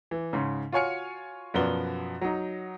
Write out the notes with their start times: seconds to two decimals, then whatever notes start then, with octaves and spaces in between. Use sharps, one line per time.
0.11 E3
0.33 G#2 C#3
0.72 F4 F#4 C#5 G#5 F6 C#7
1.54 F#2 B2 F3 B3 D5 G7
2.21 F#3 D#4